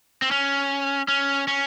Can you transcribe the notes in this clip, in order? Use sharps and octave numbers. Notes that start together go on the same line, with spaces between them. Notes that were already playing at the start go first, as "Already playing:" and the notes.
C4
C#4
C#4
C#4